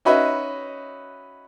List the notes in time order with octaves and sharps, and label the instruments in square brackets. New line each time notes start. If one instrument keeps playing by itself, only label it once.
[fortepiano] C#4 D#4 F#4 B4 D#5 E5